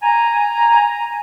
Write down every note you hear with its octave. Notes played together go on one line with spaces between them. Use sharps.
G#5 A#5